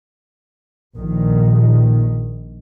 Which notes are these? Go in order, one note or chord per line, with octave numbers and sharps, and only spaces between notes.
A#1 D#3